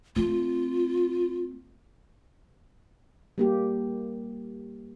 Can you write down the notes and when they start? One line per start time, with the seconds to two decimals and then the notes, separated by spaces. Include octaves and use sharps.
0.16 A3 C4 F4
3.38 G3 A#3 G4